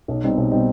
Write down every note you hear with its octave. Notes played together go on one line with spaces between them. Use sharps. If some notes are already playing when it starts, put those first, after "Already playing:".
B1
B2 G3 C4 D#4
B1
B2 G3 C4 D#4